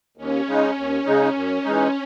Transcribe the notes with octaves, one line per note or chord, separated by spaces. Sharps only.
D#2 C#4
C#3 G#3 D#4
D#2
C#3 G#3 D#4
F#2
E3 G#3 D#4